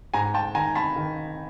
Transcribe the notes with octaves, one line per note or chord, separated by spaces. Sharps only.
G#2 G#5 A#5
G5 A5
D#3 G#5 A#5
A5 B5
D#3